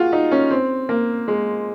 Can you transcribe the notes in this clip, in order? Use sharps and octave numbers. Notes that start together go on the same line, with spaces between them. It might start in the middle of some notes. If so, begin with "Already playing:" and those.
Already playing: F4 F#4 G#4
D#4
C#4
C4
A#3
G#3